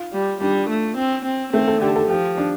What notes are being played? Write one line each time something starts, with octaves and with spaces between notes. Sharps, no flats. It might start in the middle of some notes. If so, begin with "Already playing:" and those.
Already playing: F4
G3
G3 D4
A3
C4
C4
A3 C4
A4
D3 G4
A4
F3 G4
D4